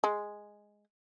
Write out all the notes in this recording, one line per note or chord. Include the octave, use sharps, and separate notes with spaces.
G#3